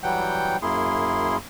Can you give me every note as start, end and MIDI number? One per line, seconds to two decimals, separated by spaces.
0.03 0.57 52
0.03 0.57 54
0.03 0.57 55
0.03 0.57 78
0.03 0.57 79
0.03 0.57 91
0.62 1.37 42
0.62 1.37 58
0.62 1.37 64
0.62 1.37 68
0.62 1.37 84